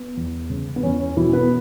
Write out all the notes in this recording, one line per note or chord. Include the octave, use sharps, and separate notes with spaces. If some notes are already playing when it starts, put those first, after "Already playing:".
Already playing: B3
E2
C#3
B3
E2 C#4
C#4
B2 E3 E4
B3 B4